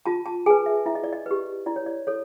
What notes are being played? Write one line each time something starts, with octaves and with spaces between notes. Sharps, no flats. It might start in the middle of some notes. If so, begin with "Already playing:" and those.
F4 A5
A5
G#4 B4 G#5
E5
E4 E5
D#5
D5
D#5
G4 B4
E4 D5
C#5
D5
A4 C#5